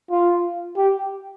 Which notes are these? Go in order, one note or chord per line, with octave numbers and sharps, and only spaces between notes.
F4
G4